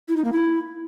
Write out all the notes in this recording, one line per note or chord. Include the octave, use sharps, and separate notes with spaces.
E4
D#4
A#3
E4